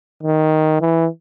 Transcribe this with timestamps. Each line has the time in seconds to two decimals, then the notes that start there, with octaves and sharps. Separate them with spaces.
0.23 D#3
0.81 E3